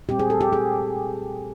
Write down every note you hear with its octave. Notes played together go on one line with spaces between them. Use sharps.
A#2 G3 C4 G4
G#4
A4
G4
G#4